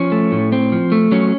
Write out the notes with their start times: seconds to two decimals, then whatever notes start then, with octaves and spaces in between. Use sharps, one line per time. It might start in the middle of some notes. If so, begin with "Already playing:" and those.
Already playing: F3 C#4
0.12 A3
0.32 A2
0.52 C4
0.72 F3
0.92 A3
1.12 F#3 C#4